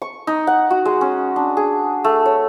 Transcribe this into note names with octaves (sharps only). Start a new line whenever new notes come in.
C#6
D#4
F#5
F#4
G#3
C#4
D4
G#4
A3
C#5